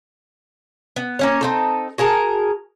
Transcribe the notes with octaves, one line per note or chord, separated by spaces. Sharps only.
B3
A#3 C#4 C#5
C4 D#4 A4
F#4 G#4 A#4 A5